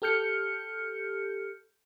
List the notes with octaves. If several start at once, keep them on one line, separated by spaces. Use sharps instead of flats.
G4 A4 F6 G6 C#7